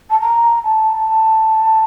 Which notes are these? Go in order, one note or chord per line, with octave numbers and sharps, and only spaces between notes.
A5
A#5
A5